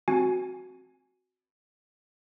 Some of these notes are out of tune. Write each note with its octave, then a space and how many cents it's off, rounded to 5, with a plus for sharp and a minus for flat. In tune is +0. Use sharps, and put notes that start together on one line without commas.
C4 +0 F#4 +0 G#5 +5